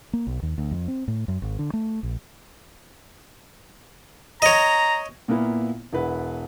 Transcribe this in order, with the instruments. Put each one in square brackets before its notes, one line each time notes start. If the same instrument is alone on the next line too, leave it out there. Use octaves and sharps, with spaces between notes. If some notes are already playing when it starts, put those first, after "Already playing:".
[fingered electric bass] A#3
B1
D#2
D2
F2
C4
A2
F#2
G#1
D3
A3
A#1
[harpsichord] C#5 D#5 [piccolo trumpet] A#5
[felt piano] A#2 A#3 B3 E4
E1 E4 B4 F#5